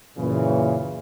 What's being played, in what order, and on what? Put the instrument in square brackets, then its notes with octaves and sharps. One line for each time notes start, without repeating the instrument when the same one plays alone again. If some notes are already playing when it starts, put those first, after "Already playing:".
[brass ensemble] F#2 A#2 C#3 E3